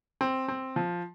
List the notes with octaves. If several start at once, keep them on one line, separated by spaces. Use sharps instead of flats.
C4
C4
F3